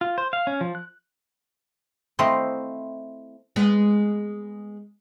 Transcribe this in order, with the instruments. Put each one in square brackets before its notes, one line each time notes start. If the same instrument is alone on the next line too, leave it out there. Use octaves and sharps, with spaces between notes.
[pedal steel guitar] F4
C5
F5
C#4
F3
F#6
[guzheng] A3 C4 E4 C5 D#5 F5
[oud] G#3 B3